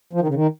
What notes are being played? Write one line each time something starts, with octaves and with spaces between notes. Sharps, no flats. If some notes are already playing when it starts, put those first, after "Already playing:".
F3
D#3
C#3
D#3